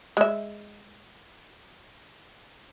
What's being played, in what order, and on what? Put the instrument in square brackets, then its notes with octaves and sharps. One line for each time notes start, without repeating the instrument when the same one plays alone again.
[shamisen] G#3 E5